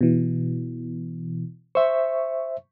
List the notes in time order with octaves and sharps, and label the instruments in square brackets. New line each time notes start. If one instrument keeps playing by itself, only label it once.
[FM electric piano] B2 E3
[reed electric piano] C5 E5 [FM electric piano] C#6